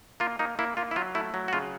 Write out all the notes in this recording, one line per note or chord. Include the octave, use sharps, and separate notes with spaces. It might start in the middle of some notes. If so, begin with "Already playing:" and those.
A#3 F4
A#3 D#4
A#3 E4
A#3 F4
E4
F#3 F4
A3 E4
F#3
F#4
C#3 F4